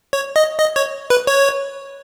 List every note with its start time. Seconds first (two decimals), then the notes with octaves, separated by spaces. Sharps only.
0.13 C#5
0.36 D#5
0.60 D#5
0.76 C#5
1.10 B4
1.27 C#5